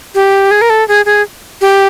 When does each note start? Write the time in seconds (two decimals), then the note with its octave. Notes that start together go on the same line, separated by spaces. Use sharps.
0.15 G4
0.51 G#4
0.61 A#4
0.70 A4
0.88 G#4
1.05 G#4
1.61 G4